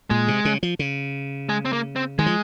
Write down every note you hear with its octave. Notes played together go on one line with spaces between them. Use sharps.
A#2 G#3
C3
C#3
F3
C#3
G#3
C4
A#3
C4
D#3 G#3
F3